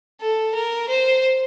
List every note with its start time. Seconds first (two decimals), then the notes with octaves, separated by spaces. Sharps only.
0.21 A4
0.54 A#4
0.89 C5